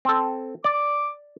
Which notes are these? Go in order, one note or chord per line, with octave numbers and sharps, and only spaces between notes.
C4 A4
D5 D6